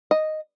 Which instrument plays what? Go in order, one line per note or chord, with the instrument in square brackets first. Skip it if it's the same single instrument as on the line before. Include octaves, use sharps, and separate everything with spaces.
[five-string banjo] D#5